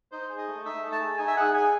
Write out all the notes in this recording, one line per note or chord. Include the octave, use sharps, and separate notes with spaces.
D#4 C5
G#4
D#5
A3
D#4 E5
A3
A5
G#4
D#4 G#5
E5
G#4 F#5
G#4 G#5